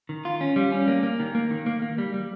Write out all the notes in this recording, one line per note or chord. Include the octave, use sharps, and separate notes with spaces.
D#3
F4
C#4
G3
C#4
A#3
A#3
D#3
A#3
D#3
A#3
A#3
G3
G3